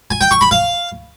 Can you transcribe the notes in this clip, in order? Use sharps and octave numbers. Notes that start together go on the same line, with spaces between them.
G#5
G5
C#6
B5
F5